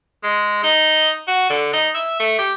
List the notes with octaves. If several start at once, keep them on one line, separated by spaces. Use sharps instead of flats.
G#3
D#4
F#4
D3
D#4
E5
A3
G4